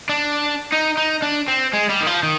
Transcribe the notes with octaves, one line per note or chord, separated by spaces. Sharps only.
D4
D#4
D#4
D4
C4
G#3
G3
D#3
F3
D#3